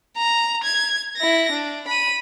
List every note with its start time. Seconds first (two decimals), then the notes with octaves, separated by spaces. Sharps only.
0.17 A#5
0.64 G#6
1.17 E4 A#6
1.51 D4
1.88 B5 D#7